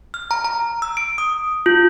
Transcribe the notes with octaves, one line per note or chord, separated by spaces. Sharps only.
F6
A#5
A#5
E6
D7
D#6
F4